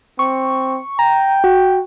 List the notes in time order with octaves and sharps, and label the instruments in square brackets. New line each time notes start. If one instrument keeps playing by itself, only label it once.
[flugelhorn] C4 [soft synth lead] C#6
[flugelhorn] G5 [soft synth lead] A#5
[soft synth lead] F#4